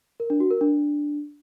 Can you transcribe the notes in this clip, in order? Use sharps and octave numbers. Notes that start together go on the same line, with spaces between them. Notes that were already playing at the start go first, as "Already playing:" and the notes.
A#4
D4
F#4
A#4
D4